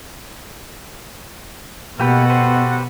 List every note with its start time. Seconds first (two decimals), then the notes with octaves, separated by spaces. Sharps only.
2.00 B2 A#3 F#4 G4 A4 B4 F#5
2.30 G4 B4 C5